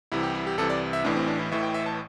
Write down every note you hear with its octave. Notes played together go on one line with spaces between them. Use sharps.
C2 C3 E3 E4
G4
E4
G4
C2 C3 E3 A4
D5
E5
A1 A2 E3 D4
C4
D4
E4
A1 A2 E3 E5
G5
E5
A5